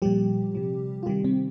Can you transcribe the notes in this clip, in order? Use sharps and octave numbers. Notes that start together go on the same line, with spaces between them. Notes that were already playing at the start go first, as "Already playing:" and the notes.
A#2 F3 G3 G4
C3 F3
F4
C3 D#3 G3 G4
C3 C4